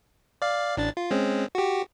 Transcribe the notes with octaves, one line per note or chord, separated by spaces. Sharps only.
D5 F5
A1 D4 A6
F4
G#3 C4 C#4
F#4 G4